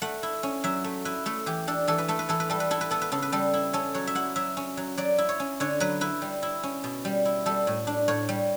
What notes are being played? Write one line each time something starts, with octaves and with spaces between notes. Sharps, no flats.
A3 F#5
E4
C#4
F#3 E5
A3
E4 B4
A3 A4
E3 G4
D4 A4
E3 A4
B4
A3 A4
B4
E3 A4
B4
G3 A4
B4
E4 A4
B4
B3 A4
B4
C#3 A4
B4
G3 A4
E4
C#4 A4
F#3 C#5
E5
E4 F#5
F#3 E5
C#4
F#3
F#3 D5
E4
C#5
C#4
D3 C#5
F#3 B4
E4 B4
G3
E4
C#4
B2
G3
E4
G3 A4
A2
D4
A2 C#5
G3